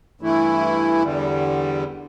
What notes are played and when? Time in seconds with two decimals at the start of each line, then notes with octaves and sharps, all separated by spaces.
0.21 G2 E3 A3 E4
1.03 E2 D3 G3